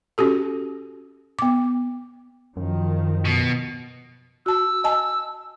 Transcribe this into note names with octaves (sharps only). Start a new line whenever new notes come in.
C#4 F#4 G4 A4
B3 D6
F#2 D#3 F3
B2
F#4 A5 E6
D#5 G#5 A5